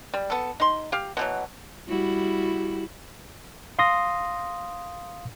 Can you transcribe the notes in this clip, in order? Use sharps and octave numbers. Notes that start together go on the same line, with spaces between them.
G3
B3 A4
D#4 C6
G4 F5
B2 E3 F#3
G3 E4 F#4
F5 C6 D#6 A#6